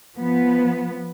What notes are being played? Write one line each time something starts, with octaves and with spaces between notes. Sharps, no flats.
F3 B3